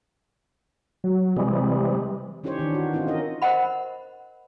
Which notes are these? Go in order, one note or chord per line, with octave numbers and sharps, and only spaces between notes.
F#3
C3 E3 G3 G#3
E3 C#4 D#4 G4 C5 C#5
D#3 E3 D4
F#4
C4 C#4 D#4 F4
C#4 A#4 D#5
A#4 C5 D#5 F#5 B5